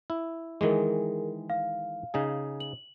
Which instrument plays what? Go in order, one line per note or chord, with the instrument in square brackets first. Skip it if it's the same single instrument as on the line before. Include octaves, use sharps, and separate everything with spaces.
[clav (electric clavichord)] E4
[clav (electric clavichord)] D#3 E3 G#3 [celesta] G#4 A#4
[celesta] F5
[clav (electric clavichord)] C#3 D#4 G#4
[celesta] F#7